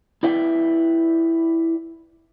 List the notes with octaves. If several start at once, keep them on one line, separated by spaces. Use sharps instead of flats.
E4 B4 D5 E5 G5